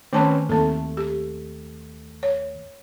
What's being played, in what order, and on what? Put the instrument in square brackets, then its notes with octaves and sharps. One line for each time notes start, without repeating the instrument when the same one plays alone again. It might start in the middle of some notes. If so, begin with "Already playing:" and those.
[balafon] D#3 A3 A5 [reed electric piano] C4 C#4 B4
[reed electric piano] D#2 A3 [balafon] C4 A4
[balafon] G4
C#5